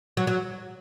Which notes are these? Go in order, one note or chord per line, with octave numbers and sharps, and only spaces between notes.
F#3
F#3